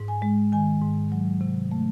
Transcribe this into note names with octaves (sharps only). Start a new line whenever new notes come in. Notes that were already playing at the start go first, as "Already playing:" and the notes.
Already playing: G#2
G#5
G#3
D#3 G#5
G#2
F#3
C3
A3